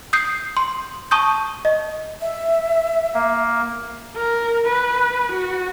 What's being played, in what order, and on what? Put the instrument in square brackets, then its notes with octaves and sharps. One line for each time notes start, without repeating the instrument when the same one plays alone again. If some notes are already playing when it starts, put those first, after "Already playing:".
[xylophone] D#6 G6 C7
C6
A5 C#6 D#6 G6
D#5
[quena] E5
[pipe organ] A#3
[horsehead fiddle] A#4
B4
F#4